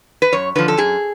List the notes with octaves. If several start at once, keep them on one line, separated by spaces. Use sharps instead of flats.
B4
F#2 C#5
D3 F3 B4
A4
F#2 G#4